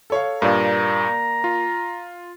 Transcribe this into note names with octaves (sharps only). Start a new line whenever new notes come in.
A4 C#5 F5
G2 A#2 A#3 D5 F5 A#5
F4